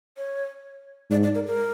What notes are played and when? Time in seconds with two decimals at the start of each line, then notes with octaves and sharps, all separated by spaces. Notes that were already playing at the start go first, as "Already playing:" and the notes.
0.17 C#5
1.11 G#2 D5
1.23 D5
1.35 A#4
1.46 A#4